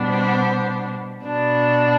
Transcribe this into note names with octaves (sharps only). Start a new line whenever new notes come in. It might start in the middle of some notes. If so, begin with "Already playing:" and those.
Already playing: B2 G3 B3 D4
C5
B2 B3 D4